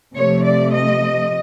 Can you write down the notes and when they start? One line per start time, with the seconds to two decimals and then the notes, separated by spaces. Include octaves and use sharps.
0.16 C3 F3 A3 C#5
0.44 D5
0.73 D#5